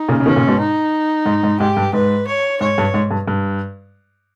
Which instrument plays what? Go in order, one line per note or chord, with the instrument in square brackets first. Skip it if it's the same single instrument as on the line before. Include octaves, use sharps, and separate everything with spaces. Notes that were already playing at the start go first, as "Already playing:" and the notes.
Already playing: [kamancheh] D#4
[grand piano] A#2 C#3
C#3
[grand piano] B2 D#3 [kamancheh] C#4
[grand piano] A#2 C#3
G#2 B2
[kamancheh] D#4
[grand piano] G#2
G#2
[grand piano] G#2 [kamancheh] G4
[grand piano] G2
[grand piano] G#2 [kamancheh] B4
[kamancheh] C#5
[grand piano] G#2 [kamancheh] C#5
[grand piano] G2
G#2
G2
G2